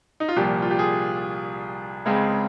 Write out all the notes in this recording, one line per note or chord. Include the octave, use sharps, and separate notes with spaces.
D#4
F4
C2 A#2 F3 G4
F4
G4
G#4
C#2 C#3 G#3 C4